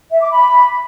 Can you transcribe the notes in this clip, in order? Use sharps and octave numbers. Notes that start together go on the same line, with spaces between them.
E5
D6
B5